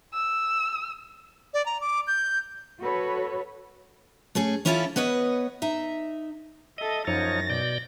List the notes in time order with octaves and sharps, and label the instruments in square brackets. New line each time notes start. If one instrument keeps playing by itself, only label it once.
[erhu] E6
[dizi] D5
A#5
D6
G6
[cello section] F#4 A4 B4 C#5
[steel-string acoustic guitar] A3 C#4 G#4
E3 C#4 E4 F4 G4 A4
B3 B4 C#5 D#5
D#4 E5
[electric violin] A4 E5 [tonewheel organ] D#5
[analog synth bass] F#2 [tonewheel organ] F3 D#4 C#5 [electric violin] A6 A#6
[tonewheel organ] B2 D5 G6